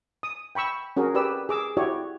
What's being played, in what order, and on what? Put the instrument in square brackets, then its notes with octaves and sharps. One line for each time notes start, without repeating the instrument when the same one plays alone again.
[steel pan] D#6
G5 B5 C#6 E6
C#4 F#4 G#4 A#4
G4 B4 D5 E6
G#4 D6 E6
E4 F#4 G4 C#5 D5